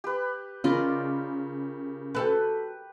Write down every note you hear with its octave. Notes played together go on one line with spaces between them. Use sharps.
G4 B4
C#3 F4 A#4 D5 D#5 B5
F#4 A4 B4 G5